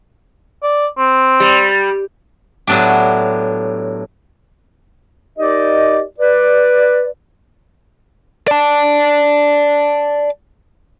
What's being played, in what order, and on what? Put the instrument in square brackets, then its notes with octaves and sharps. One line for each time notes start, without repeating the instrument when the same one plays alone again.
[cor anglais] D5
C4
[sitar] G3
[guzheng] A2 F#3 B3 D4 G4
[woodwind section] D#4 G4 A#4 D5 D#5
B4 D5
[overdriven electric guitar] D5 A5